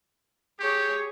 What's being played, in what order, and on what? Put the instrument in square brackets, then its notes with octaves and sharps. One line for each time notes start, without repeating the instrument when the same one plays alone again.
[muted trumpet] G4 [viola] G#4 C#5